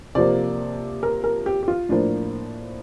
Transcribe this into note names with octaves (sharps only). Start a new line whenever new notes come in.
C3 F3 A#3 D5
A#4
A#4
G4
G4
F4
A2 F3 A#3 D4